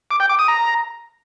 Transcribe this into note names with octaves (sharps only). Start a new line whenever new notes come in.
D6
G5
D6
D#6
A#5